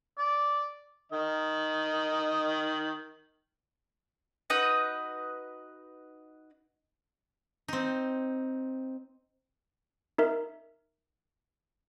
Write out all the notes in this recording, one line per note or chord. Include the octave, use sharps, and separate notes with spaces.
D5
D#3 D#5
D#4 F#4 B4 D#5
C4 D#4
D#4 A#4 E5